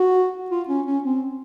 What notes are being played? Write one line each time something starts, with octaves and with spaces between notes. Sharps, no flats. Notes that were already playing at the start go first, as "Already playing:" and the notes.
Already playing: F#4
F4
C#4
C#4
C4